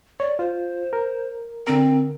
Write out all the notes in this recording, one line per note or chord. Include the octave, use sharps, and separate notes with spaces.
C#5 D5
F4 C5
A#4
D3 C4 A#4